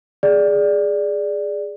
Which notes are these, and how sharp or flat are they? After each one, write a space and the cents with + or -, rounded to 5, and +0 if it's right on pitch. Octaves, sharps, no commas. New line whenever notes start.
G#4 +0 D5 +0